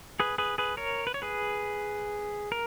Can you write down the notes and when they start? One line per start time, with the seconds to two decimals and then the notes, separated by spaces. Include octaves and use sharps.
0.20 G#4 B4
0.38 G#4 B4
0.58 G#4 B4
0.77 A#4 C#5
1.07 B4
1.14 C#5
1.22 G#4 B4
2.52 A#4